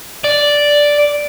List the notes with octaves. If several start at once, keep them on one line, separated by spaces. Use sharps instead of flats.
D5